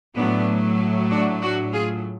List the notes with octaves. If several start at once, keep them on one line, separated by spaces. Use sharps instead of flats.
A2 F#3 A3 B3 D4
D4 F#4
D4 F#4
F4 G#4